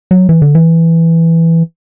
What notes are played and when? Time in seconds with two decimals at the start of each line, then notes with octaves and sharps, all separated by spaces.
0.11 F#3
0.29 E3
0.42 D3
0.55 E3